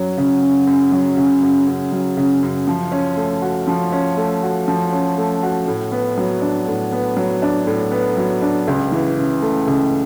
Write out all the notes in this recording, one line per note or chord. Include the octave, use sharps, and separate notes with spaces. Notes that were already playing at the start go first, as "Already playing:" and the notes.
Already playing: F#2 F#3
C#3
F#2
F#2
F#3
C#3
F#2
F#2
F#3
C#3
F#2
F3
C#4
A3
F#4
F3
C#4
A3
F#4
F3
C#4
A3
F#4
A2
B3
F#3
D4
A2
B3
F#3
D4
A2
B3
F#3
D4
C#2
E3
C#3
A3
C#2